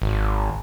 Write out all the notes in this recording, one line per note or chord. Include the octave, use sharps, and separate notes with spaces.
G#1